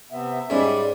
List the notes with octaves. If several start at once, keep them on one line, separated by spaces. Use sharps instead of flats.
C3 B3 E5
G#2 G3 C#4 D5